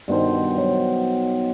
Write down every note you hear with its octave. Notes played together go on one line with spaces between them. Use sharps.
G2 B2 D#3 C5
F#3